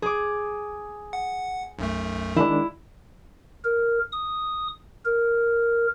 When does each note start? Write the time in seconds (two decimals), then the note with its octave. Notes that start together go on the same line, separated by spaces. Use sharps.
0.02 G#4 D6
1.13 F#5
1.79 B1 F#2 A3
2.36 D#3 G#3 D4 E4
3.64 A#4
4.12 D#6
5.05 A#4